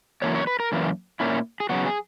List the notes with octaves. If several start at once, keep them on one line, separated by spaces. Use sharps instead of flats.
F#2 E3 A#3 C#5
C#5
B4
A#4
F#2 E3 A#3
A#2 A#3 C#4 E4
G#4
C#3 F#3 B3 F#4
G#4